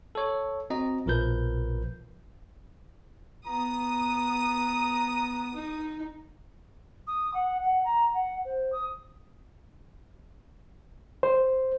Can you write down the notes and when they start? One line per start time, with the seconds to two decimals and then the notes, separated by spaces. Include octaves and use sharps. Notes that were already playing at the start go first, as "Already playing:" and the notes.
0.15 A4 C#5
0.70 C4 F#4 D#5 A#5
1.06 A#1 B2 F3 A#4 B4 G6
3.47 B3 A#5 D#6
5.55 D#4
7.07 D#6
7.34 F#5
7.63 F#5
7.84 A#5
8.13 F#5
8.45 C5
8.72 D#6
11.23 C5